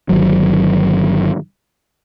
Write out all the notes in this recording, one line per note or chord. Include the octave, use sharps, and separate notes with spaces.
G1 D#3 F#3